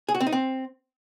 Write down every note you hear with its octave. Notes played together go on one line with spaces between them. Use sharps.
G#4
F#4
C4
D#4
C4